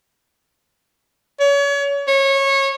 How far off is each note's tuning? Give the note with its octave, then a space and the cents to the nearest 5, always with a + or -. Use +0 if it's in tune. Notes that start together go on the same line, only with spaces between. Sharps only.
C#5 +35
C#5 -20